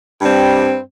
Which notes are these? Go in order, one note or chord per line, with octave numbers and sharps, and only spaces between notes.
G2 G3 C4